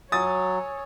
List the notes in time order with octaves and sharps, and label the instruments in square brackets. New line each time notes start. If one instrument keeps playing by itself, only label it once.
[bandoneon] F#3 [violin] C#5 [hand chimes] G#5 C#6 E6 [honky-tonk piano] D#6 A6